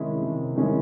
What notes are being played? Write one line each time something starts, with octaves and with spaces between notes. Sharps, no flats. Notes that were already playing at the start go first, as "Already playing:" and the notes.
Already playing: C3 D#3 G#3 C#4 E4
C3
D#3 G#3 C#4 E4